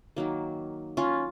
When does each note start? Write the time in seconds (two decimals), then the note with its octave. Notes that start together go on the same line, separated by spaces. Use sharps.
0.16 D#3 F#3 A#3
0.97 C#4 F4